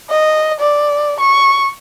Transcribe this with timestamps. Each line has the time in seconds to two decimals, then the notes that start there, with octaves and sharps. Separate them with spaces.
0.10 D#5
0.60 D5
1.21 C#6